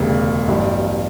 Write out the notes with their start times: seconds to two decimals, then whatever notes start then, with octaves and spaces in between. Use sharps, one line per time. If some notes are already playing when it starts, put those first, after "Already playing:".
Already playing: E1 D2 C#3 G3
0.47 A1 G2 F#3